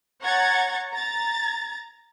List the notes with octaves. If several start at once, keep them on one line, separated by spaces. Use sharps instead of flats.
C#5 F#5 A#5 C#6 G#6 A6
A#5 A6